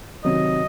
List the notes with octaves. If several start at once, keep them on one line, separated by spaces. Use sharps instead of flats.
C3 D#3 F#3 D#5